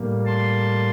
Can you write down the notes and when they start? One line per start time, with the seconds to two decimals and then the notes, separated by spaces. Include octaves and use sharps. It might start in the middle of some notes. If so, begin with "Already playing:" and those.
Already playing: A2 G3 A#3
0.25 A5 C6